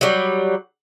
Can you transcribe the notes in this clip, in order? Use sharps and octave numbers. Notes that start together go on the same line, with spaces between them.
F#3 G3